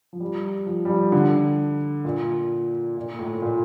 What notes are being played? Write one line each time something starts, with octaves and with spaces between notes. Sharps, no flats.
F3
G3
F3
G3
F3
D3
A#2
A#2
A2
A#2